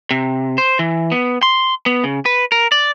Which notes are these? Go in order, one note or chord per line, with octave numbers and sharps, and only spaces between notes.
C3
C5
E3
B3
C6
B3
C#3
B4
A#4
D5